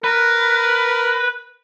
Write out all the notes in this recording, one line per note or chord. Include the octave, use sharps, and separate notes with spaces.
A#4 B4